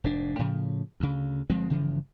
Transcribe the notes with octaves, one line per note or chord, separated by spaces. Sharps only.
F1 G#2 D4
A2 C#3 F3
D2 C#3
G1 F3 G#3 C4
G1 C#3 E3 F3